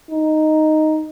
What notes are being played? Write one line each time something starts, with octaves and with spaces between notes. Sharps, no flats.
D#4